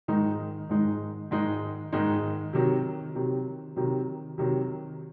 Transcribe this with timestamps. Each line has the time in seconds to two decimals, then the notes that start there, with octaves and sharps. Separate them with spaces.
0.08 G#2 D#3 G#3 D#4
0.69 G#2 D#3 G#3 D#4
1.31 G#2 D#3 G#3 D#4
1.92 G#2 D#3 G#3 D#4
2.53 C3 D#3 F#3
3.15 C3 D#3 F#3
3.76 C3 D#3 F#3
4.38 C3 D#3 F#3